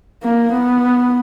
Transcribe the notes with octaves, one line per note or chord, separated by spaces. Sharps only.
A#3
B3